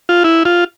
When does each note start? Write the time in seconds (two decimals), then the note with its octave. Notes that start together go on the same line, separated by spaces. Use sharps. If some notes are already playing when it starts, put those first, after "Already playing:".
0.09 F4
0.24 E4
0.45 F4